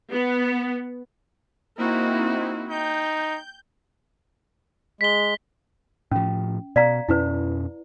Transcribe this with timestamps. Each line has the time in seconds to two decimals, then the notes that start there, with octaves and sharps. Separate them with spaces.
0.12 B3
1.77 A#3 C4 D#4 E4 F#4
2.70 D#4 G5 G6
5.01 G#3 B6 G7
6.12 A2 F3 C#4
6.76 B2 D5 F5 A#5
7.09 F2 B2 C#4 E4 B4